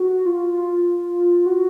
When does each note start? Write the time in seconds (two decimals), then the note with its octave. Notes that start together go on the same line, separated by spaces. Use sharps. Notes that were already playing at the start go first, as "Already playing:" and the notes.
Already playing: F#4
0.25 F4
1.46 F#4